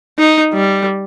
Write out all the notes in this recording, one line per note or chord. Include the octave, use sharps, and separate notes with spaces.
D#4
G3